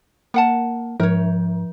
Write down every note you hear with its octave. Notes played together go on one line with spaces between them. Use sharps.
A#3 A#4 F#5 A5
G#2 F3 A#4 C#5